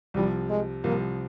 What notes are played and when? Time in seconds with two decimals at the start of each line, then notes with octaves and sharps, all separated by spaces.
0.14 C2 C3 F3 G3
0.49 G#3
0.84 C2 C3 F3 A#3